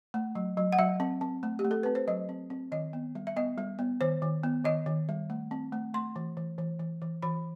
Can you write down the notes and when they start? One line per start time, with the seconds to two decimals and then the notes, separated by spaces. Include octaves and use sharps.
0.14 A3
0.35 F#3
0.57 F#3
0.72 F#5
0.79 F#3 E5
1.00 C4
1.21 C4
1.43 A3
1.59 G4
1.64 A3
1.71 A4
1.83 C4 B4
1.95 C5
2.08 F#3 D#5
2.29 C4
2.50 C4
2.72 D#3 D#5
2.93 B3
3.15 G3
3.27 E5
3.36 B3 D#5
3.58 G3
3.79 B3
4.01 D#3 C5
4.22 D#3
4.43 B3
4.65 D#3 D#5
4.86 D#3
5.09 G3
5.30 A3
5.51 C4
5.73 A3
5.94 A3 C6
6.16 E3
6.37 E3
6.58 E3
6.80 E3
7.02 E3
7.22 E3 B5